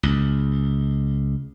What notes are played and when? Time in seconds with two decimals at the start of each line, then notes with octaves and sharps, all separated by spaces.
0.03 C#2